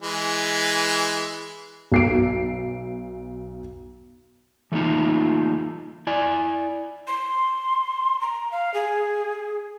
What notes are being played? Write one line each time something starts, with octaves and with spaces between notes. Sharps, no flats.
E3 G#3
B1 C7 D7
E3 A3 A#3 D#4 F4
E4 D5 G#5
C6
A#5
F5
G#4